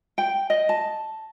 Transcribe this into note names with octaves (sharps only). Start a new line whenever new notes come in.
G5
D#5
A5